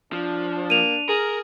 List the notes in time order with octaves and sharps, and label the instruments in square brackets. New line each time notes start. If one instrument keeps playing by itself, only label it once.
[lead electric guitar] F3 [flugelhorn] D4
[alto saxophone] A#3 [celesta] D#7 F7
[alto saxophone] G#4 [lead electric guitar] A#4